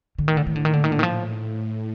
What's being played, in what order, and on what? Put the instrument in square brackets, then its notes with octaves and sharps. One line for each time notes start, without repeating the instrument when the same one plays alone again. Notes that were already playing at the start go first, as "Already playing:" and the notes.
[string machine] A2 [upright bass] D3
[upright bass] D#3
D3
D#3
D3
[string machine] A#2 [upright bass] D#3
[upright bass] D3
D#3
D3
D#3
[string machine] A2 [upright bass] F3
[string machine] A2